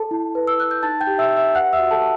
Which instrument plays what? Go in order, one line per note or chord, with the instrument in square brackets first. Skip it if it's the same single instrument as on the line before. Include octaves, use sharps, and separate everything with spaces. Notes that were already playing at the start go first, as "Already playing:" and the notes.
Already playing: [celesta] A4 A5
E4
B4
E6
B4 F#6
G6
D#4 A5 A6
G5 G6
G4
E5 E6
G4
E5 E6
B4 F#5 F#6
E5 E6
F#4
A4 A5